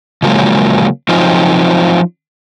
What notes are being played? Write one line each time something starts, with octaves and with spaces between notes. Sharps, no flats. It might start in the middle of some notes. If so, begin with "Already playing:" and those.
C#3 F3 F#3 G#3 A#3
F3 F#3 C4 D#4 F4